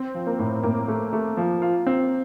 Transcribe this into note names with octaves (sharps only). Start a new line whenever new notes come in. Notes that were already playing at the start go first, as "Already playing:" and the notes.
Already playing: C4
F3
A#3
A2
A2 A#3
A3
A3
F3
F4
C4